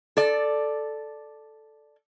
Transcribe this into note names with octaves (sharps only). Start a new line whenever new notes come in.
A4 D5